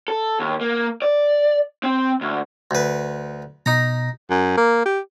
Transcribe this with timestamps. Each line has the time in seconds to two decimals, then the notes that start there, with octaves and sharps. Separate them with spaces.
0.08 A4
0.40 D#2
0.61 A#3
1.02 D5
1.83 C4
2.21 D2
2.71 D2 B4
3.66 B2 D#4 A#5
4.30 F#2
4.57 A#3
4.85 G4